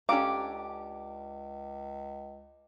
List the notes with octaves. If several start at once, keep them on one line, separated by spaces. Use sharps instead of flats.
C#2 C#4 D4 G4 A4 F5 A#5 D6